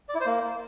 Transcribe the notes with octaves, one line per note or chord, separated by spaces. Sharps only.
D5
E4
C5
A#3